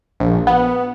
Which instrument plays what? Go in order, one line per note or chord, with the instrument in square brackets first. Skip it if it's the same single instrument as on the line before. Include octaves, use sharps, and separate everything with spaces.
[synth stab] A#1
B3